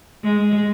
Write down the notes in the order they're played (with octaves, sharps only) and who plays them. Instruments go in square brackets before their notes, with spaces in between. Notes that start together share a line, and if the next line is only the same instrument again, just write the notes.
[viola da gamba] G#3